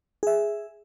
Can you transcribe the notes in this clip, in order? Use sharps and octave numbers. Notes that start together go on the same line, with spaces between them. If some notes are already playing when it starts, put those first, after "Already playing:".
G#4 E5